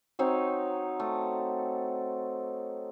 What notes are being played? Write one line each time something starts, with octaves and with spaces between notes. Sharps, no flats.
F#3 C4 D#4 C#5
A3